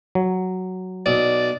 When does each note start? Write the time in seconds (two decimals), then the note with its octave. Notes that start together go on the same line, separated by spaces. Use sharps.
0.15 F#3
1.06 B1 D5